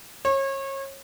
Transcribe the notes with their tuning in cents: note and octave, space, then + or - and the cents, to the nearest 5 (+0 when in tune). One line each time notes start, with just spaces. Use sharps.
C#5 -30